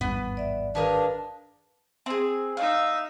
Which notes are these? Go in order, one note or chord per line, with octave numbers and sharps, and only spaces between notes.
G#1 E2 G2 B3
D5 E5
D#3 D4 G#4 A#4 B4 F5 A5
C4 G#4
D#4 E5 F5